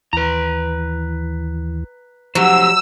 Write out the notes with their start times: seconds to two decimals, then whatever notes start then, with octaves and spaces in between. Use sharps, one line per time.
0.13 D#2 E3 B4 A#5
2.35 F3 F#3 G4 C5 E6